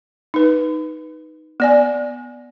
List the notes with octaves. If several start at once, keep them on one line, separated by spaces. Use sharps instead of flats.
D#4 B4
B3 D5 G#5